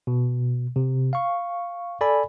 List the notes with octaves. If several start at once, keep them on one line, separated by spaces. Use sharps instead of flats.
B2
C3
F5 C#6
A4 D5 G#5 B5